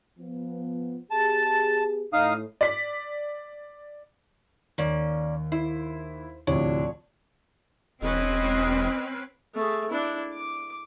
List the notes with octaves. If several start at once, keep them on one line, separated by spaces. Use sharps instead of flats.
F3 B3
B3 G4 G#4 A5
A2 D#4 F5 D#6
D5 B6
D#2 A#3 C#4 D5
E4 C5
D2 A2 C3 F3 D4 C#5
E1 C4 C#4 B4 D#5
A3 G#4
D4 E4
D6